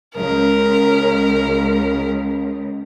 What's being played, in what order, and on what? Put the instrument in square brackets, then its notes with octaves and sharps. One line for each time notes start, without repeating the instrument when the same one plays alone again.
[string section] C#2 [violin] A#4